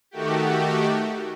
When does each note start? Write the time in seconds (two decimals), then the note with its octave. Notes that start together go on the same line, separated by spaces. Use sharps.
0.11 D#3 A3 F#4 G4